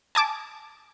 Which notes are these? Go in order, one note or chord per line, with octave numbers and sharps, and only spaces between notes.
G#5 A5 D6